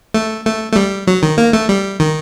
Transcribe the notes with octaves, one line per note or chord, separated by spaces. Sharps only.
A3
A3
A3
G3
F#3
D#3
A#3
A3
G3
D#3